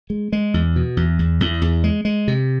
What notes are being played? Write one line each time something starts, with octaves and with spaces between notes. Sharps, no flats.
G#3
G#3
E2
B2
E2
E2
E2
E2
G#3
G#3
C3